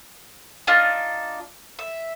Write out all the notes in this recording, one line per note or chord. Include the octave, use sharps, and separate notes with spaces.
D4 D#4 F4
E5